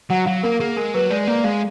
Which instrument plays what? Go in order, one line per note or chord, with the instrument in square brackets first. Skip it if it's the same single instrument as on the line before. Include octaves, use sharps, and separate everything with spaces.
[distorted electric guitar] F#3 [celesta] F#5
[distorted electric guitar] F#3 [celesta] F5
[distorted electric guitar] A#3 [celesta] A#4
[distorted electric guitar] A#3 [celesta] G#4
[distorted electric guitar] G#3 [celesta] A#4
[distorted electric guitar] F#3 [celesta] B4
[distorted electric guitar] G#3 [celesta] D5
[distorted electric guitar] A#3 [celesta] D5
[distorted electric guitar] G#3 [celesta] F5